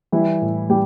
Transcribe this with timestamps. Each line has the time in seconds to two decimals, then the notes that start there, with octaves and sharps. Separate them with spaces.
0.12 E3 G3 E4
0.42 A2
0.70 G3 G4